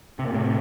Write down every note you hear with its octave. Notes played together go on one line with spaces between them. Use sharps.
C3
A#2
A2 C3